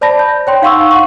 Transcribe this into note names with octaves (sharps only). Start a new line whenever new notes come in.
C5 D5 A5 B5 A#6
G6
C#5 G5 C6
D#4 F5 F#5 C6 C#6 E6
F#5 C#6